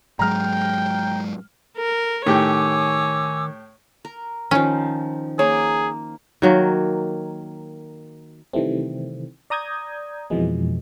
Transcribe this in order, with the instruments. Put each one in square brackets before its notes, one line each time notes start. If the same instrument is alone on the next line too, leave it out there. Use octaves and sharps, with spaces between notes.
[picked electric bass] G#2 F#3 G#3 [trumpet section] G5 [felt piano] A#5 F6
[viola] A#4
[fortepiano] A2 G4 G5 [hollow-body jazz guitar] D#3 [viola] C#5 [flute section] G#5 D6 E6
[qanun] A#4
[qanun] D#3 F3 [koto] C#4
[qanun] A#3 [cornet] G#4 [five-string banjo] C#5
[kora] D#3 F#3 A#3
[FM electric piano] C3 D#3 E3 G3 A3 C4
D5 A#5 D#6 G6 G#6
F2 B2 E3 F3 G#3 B3